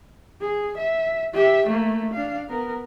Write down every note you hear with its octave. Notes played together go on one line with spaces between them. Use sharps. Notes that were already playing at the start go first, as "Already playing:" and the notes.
G#4
E5
G4 E5
A3 A#3
D4 F5
B3 A#4